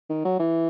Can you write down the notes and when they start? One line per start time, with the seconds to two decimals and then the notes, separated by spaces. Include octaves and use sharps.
0.09 D#3
0.25 F#3
0.39 E3